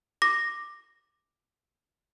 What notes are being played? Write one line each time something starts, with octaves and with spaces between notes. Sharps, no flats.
D6 A#6